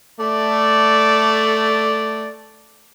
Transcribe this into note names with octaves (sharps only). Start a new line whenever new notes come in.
A3 D5